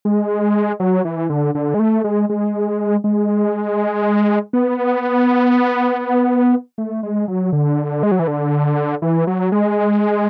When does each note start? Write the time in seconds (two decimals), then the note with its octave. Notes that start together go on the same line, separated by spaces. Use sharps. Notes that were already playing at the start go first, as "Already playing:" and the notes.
0.05 G#3
0.80 F#3
1.05 E3
1.30 D3
1.55 D3
1.74 G#3
1.79 A3
2.04 G#3
2.29 G#3
3.04 G#3
4.53 B3
6.78 A3
7.03 G#3
7.28 F#3
7.53 D3
8.03 G#3
8.12 F#3
8.19 E3
8.28 D3
9.02 E3
9.27 F#3
9.52 G#3